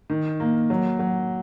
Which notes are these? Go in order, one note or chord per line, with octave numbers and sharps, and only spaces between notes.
D#3
A#3
F#3
F#3